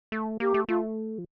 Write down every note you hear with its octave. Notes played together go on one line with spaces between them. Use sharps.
A3
A#3 G4
A3
A3 F4
F3